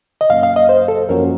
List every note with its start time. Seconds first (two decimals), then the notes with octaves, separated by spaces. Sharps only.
0.21 D#5
0.30 F#2 C#3 F#3 A#3 C#4 F5
0.43 F5
0.56 D#5
0.69 C5
0.88 A4
1.09 F#2 F3 A#3 C#4 F#4 A#4